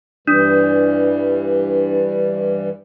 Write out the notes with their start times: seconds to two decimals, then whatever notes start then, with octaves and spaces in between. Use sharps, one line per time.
0.27 G2 E3 G3 D4